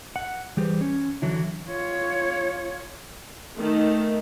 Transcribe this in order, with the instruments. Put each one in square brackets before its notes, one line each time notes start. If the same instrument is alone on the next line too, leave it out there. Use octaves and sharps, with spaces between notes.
[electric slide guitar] F#5
E3 G3 G4 G#4 B4 C5
C#4
D3 E3 F#3 E4
[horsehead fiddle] F4 C#5
[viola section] D#3 [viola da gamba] A3